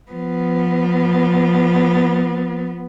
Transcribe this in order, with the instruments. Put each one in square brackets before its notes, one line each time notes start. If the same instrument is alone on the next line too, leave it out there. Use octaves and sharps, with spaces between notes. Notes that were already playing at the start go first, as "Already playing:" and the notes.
[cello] F3 B3